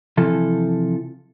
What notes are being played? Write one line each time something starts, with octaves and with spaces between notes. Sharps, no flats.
C3 E3 F3 A4